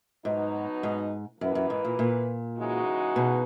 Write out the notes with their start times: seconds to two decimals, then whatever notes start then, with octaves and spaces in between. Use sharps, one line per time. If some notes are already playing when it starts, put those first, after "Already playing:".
0.24 G#2 B2 F#3 B3 D#4
0.83 G#2
1.40 F#2 E3 A#3 E4 B4
1.55 F#2
1.70 G#2
1.85 A#2
1.99 A#2
2.57 C#3 E3 G#3 D#4 F#4
3.16 B2